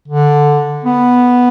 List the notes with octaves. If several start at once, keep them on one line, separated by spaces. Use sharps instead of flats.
D3
B3